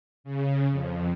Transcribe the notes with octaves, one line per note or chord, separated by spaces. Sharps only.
C#3
F2